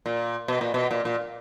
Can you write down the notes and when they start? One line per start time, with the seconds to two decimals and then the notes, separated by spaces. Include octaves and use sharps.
0.06 A#2
0.48 B2
0.61 A#2
0.74 B2
0.91 A#2
1.05 A#2